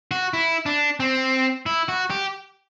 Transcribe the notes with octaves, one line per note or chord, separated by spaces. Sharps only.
F#4
E4
D4
C4
E4
F#4
G4